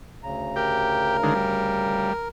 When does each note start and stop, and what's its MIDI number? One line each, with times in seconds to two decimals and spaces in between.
0.23 2.11 38
0.23 2.11 49
0.23 2.11 82
0.56 1.17 67
0.56 2.28 70
1.23 1.34 50
1.23 1.34 51
1.23 1.34 56
1.35 2.13 55